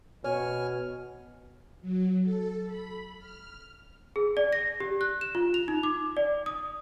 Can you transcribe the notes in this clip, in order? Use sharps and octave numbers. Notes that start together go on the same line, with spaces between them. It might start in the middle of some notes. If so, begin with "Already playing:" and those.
B2 C#5 G#5 F6
F#3
A4
B5
F6
G#4
D5
A#6
G4
F#6
E7
F4
F7
D#4
D6
D5
D#6